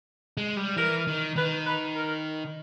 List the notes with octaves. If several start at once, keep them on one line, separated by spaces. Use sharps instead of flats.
G#3
G3
E3 A#4
D#3
D#3 B4
B4
A#4